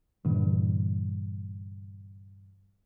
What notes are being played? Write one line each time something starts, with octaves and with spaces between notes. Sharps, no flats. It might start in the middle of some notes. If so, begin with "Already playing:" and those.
G2 A#2 D3 E3